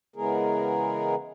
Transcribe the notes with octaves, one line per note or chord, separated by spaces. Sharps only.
C#3 E3 G#3 B3 G#4 A#4